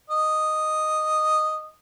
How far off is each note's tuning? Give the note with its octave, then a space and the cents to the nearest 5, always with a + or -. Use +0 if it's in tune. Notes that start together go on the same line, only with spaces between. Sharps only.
D#5 -5